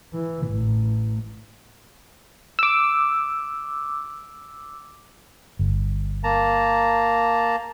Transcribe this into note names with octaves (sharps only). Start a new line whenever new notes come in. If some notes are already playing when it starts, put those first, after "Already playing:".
E3
A1
D6 E6
G1
A#3 A5 A#5